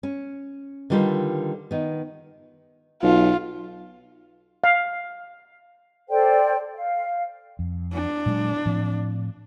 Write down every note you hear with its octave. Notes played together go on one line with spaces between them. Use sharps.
C#4
D3 D#3 G3 F4 A4 B4
D#3 B3
B1 F4
F5
A4 C5 D5 G5
F5
F2
D4
A#2 F#3 G#3
A2 F3 C4